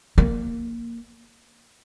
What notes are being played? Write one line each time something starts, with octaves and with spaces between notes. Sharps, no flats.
A#3